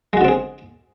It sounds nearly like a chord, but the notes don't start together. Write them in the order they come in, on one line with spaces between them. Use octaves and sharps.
G#3 F#4 D3 C4 G#4